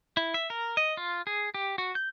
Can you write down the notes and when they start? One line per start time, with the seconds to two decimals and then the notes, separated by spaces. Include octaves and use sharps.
0.17 E4
0.34 E5
0.50 A#4
0.77 D#5
0.97 F4
1.27 G#4
1.55 G4
1.78 F#4
1.95 G6